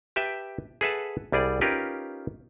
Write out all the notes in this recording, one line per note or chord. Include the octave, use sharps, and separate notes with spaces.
G4 B4 E5 G5 A5
G#4 A4 B4 E5 F#5 A5
C2 G3 G#4 D5
C#4 D#4 F4 G4 A#4 B4